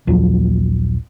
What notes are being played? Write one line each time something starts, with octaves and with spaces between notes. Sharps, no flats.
A#1 D#2 F3 F#3